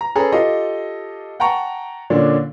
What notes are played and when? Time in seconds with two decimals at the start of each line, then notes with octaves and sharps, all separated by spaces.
0.01 A#5
0.15 C#4 G#4 A4 B4 A#5
0.32 F4 G4 A4 D#5 F5
1.40 F#5 G5 A5 A#5 C#6
2.10 A#2 D3 C#4 D4